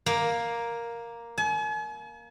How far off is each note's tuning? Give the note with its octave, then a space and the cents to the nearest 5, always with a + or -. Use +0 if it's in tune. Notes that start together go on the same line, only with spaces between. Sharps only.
A#3 +5
G#5 +45